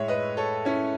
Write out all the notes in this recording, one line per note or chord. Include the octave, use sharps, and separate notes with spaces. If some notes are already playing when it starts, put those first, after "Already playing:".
Already playing: A2 G#3 C#5 E5
B4 D#5
A4 C#5
C#4 E4